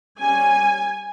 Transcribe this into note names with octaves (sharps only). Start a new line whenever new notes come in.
G3 C#4 G#5